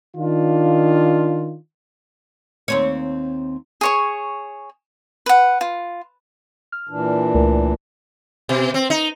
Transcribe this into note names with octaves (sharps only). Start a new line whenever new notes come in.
D#3 D4 F4
D#2 C4 C#5
G#4 C#5 C#6
B4 F#5
F4
F6
A#2 E3 D4
C#2 A3 A#4
B2
C4
D#4